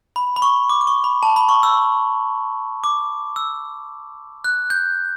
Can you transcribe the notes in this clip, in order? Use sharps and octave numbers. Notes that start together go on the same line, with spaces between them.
B5
B5
C#6
D6
D6
C#6
B5
A5
B5
C#6
E6
D6
E6
F#6
G6